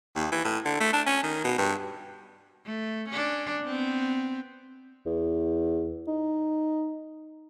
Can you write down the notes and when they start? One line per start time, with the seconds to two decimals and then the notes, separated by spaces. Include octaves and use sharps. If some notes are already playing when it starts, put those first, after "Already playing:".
0.16 D#2
0.32 E3
0.44 A2
0.65 D3
0.80 A3
0.93 D4
1.07 C#4
1.23 D#3
1.44 B2
1.58 G2
2.65 A3
3.09 C#4 D4
3.64 B3 C4
5.06 E2
6.07 D#4